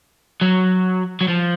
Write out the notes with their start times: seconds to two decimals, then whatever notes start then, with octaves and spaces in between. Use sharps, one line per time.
0.41 F#3
1.21 F#3
1.28 F3